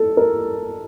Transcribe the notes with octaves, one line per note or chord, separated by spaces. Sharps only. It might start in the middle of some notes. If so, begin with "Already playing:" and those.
Already playing: A4
A#4